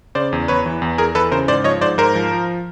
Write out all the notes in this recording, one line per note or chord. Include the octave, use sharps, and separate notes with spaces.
C#3 C5 D5
E2
E2 B4 C#5
E3
E2
E2 G#4 A#4
E3 A4 B4
C#3 A#4 C5
G#2 C5 D5
F3 C#5 D#5
G#2 C5 D5
G#2 A#4 C5
F3
F3